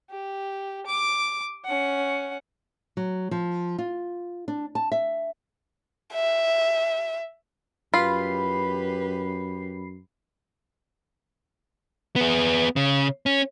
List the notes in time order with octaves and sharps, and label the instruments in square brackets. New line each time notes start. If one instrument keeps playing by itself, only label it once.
[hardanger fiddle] G4
D6
C#4 F#5
[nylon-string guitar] F#3
F3
F4
D4
A5
E5
[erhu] E5
[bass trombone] F#2 [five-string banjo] F4 [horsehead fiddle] G4 B4 [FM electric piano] B5 C7
[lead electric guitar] B3 G#4
C#3
C#4